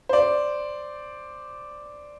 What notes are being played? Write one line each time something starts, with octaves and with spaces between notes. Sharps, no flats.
C5 D5